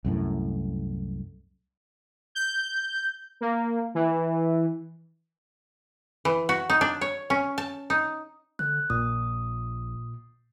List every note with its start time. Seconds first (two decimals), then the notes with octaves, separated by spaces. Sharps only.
0.04 C2 F#2 A2
2.35 G6
3.41 A#3
3.95 E3
6.25 E3
6.49 F#4
6.70 D#4
6.81 D4
7.01 C#5
7.30 C#4
7.58 A5
7.90 D#4
8.59 D3 F#6
8.90 A#1 A#2 D#6